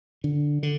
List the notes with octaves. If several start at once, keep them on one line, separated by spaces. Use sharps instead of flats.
D3
D3